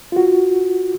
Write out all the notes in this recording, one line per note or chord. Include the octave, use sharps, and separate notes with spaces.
F4 F#4